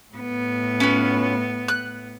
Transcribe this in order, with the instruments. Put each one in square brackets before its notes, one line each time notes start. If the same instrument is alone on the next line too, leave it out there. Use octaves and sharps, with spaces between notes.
[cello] A2 B3
[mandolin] C#4 F4 B4
F#6